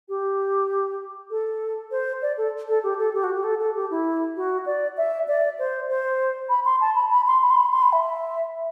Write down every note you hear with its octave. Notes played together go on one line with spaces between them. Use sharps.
G4
A4
C5
D5
A4
A4
G4
A4
G4
F#4
G4
A4
A4
G4
E4
F#4
D5
E5
D5
C5
C5
B5
C6
A5
B5
B5
C6
B5
C6
B5
C6
B5
E5